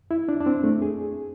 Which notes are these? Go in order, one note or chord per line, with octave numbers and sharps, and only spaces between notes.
E4
D4
D4
C4
A3
G#4